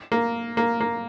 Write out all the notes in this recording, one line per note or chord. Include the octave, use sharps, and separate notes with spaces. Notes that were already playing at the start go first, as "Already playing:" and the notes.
A#3
A#3
A#3